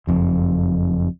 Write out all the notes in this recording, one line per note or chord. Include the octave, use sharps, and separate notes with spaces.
F#1 F2